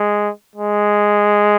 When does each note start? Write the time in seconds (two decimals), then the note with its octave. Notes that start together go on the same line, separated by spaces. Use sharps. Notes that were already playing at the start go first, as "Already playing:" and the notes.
Already playing: G#3
0.56 G#3